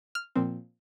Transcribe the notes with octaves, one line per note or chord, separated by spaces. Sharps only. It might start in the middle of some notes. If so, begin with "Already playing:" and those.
F6
A#2 F3 C4